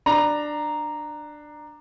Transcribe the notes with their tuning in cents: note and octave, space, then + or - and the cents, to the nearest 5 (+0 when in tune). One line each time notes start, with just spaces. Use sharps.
D4 +15 A#5 +0